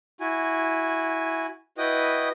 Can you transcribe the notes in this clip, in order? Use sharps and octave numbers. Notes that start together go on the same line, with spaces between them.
E4 F#4 G#5
E4 F#4 B4 D#5 G5 D#6